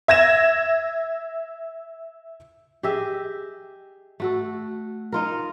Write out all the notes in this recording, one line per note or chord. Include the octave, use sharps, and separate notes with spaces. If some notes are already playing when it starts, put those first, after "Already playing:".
E5 G#6 A#6 E7
G4 G#4 D#5 E5
A3 F#4 A4
D#4 F4 A#4